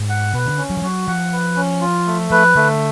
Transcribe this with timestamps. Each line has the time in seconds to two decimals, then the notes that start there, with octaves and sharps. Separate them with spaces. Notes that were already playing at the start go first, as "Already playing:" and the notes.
Already playing: G#2
0.09 F#5
0.34 B2 B4
0.45 D3
0.58 C#4
0.70 F#3
0.77 F3
0.82 F#3 F#4
1.08 F3 F#5
1.32 B4
1.56 C#4
1.81 F4
2.07 A3
2.31 F3 B4
2.56 D3 A3